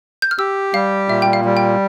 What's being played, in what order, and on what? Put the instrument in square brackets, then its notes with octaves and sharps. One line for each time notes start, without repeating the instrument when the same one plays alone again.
[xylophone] G6
F6
[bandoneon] G4 [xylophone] E6
[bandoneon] G3 [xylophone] F5
[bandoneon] A#2 [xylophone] E5
[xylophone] G5
F5
[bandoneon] G3
[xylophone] G5